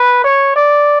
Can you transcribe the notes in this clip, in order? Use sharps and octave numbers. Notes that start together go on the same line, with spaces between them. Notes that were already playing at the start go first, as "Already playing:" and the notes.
Already playing: B4
C#5
D5